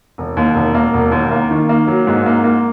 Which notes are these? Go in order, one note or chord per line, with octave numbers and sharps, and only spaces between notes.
E1
D#2
E1
A#3
E1
D#2
A#3
D#3
A#3
F#3
G#2
A#3
A#3